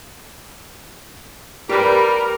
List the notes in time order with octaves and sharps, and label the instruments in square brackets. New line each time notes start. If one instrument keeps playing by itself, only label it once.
[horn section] G3 [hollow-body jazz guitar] G4 B4 [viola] A#4